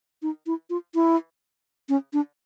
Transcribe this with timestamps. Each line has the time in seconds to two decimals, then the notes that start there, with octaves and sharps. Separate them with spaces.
0.22 D#4
0.46 E4
0.70 F4
0.95 E4
1.89 C#4
2.13 D4